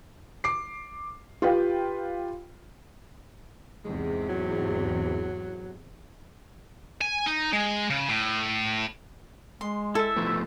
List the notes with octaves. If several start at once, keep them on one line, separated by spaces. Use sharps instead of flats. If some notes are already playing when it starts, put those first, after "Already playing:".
D6 C7
F4 G4 B4 F5 G5
E2 G#2 C3 G#3
F#3
G#5
D#4
G#3
C#3
A2
G#3 C6
E4 A4 E5
F3 A3 B3